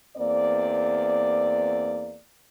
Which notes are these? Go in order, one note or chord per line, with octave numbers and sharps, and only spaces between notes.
E2 A#3 C4 D5